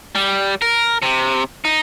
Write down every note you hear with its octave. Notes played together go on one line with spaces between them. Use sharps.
G3
A#4
C3
D#4